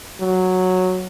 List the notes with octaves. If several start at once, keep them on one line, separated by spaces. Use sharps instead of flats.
F#3